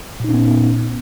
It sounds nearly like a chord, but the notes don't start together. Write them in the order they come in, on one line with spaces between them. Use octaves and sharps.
A#2 D#4 C#4 B3